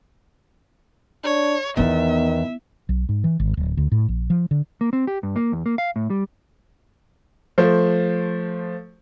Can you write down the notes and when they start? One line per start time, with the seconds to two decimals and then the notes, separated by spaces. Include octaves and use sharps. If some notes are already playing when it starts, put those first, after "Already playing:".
1.24 D4 C#5
1.77 E2 D#3 B3 E4 E5
2.89 B1
3.09 G#2
3.24 E3
3.40 G#1
3.57 D1
3.77 D2
3.92 A2
4.08 A#1
4.30 F3
4.51 D3
4.81 A#3
4.93 C4
5.07 G4
5.23 G2
5.36 A#3
5.52 E2
5.66 A#3
5.78 F5
5.96 A2
6.10 G3
7.58 F3 A3 C5